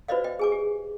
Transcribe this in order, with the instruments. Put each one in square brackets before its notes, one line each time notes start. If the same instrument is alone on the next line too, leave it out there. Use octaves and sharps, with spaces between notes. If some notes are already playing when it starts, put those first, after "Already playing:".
[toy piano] F#4 B4 C5 D5 D#5 F5
D#5 G5
G#4 G#5 D6
G4